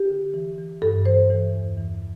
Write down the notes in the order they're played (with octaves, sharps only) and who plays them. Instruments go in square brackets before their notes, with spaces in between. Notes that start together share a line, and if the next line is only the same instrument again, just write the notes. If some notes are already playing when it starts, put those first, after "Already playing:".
Already playing: [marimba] G4
D3
E3
E3
G2 A4
E3 C5
E3
E2
E3